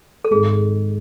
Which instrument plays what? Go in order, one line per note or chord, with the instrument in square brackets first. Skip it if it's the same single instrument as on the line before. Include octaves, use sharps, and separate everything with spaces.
[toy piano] A4
[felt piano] G#1 G#2 G#3 [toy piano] G#4